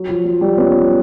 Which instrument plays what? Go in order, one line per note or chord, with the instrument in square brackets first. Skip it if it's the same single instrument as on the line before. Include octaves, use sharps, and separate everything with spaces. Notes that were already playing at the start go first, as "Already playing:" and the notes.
Already playing: [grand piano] F#3
F3
F#3
F3 G3
B3 C#4